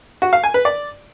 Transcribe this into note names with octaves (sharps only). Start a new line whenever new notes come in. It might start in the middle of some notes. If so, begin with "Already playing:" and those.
F#4
F5
G#5
B4
D5